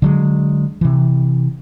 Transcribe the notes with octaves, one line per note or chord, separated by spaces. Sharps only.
D3 F#3 G#3
C3 E3